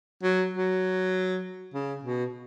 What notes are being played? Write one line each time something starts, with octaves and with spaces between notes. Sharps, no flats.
F#3
F#3
C#3
B2